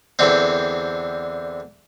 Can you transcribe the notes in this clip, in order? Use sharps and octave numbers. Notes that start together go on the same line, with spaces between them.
E2 D3 C4